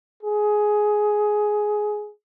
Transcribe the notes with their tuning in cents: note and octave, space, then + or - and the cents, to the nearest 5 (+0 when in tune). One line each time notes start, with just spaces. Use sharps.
G#4 +10